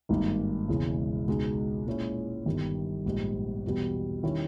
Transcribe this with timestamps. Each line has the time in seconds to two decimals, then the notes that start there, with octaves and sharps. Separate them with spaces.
0.09 G#1 G2 D#3 A#3 D#4
0.68 E1 E2 C#3 E3 G#3
1.27 C#2 B2 G#3 D#4
1.87 A#2 G#3 C#4 E4
2.46 G1 G2 D#3 G3
3.05 A#1 G#2 G3
3.64 E2 B2 G3
4.23 D#3 G3 C#4 E4